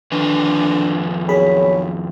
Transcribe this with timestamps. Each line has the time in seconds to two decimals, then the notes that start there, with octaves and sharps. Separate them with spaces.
0.12 F2 D3 D#3 B4
1.29 B1 G#4 A#4 C#5 B5